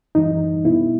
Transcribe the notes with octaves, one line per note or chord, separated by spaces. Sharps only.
F#2 E3 G3 D#4
B2 G3 B3 E4